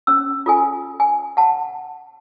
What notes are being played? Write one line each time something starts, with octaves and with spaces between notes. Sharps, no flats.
C#4 E6
F4 A4 G#5
G#5
F#5 A5